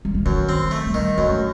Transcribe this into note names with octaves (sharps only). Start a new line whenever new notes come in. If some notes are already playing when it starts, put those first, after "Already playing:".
G3
F#3
F#2 D#3
C4
F#3
A3
G3
D#3
F#2 A3